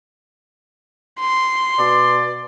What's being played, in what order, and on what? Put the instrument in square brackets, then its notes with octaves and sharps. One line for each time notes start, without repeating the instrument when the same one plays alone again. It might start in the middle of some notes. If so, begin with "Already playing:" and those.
[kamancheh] C6
[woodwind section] B2 D5